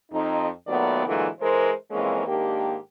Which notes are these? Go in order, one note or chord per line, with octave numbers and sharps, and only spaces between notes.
F2 D#4
A#2 D#3 F#3 A3 B3 D5
A#2 D3 E3 F#3 G#3 A3
E3 G#3 A#4 C5
F2 E3 G#3 A#3 C4 C#4
G#2 D#3 A#3 D4 G4